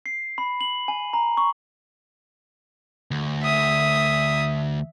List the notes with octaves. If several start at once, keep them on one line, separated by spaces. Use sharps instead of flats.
C7
B5
F#7
G#5
A#5
C#6
D2
E5 D#6